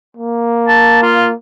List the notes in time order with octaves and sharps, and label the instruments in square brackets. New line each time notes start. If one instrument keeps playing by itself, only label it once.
[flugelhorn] A#3
[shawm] A5
F4